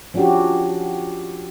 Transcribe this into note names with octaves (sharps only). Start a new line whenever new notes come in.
F3 C#4 D4 F#4 G4